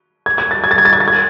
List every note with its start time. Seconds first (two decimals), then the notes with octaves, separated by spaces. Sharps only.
0.26 G#6
0.38 G#6
0.51 A6
0.64 G#6
0.71 A6
0.78 G#6
0.85 A6
0.93 G#6
1.00 A6
1.08 G#6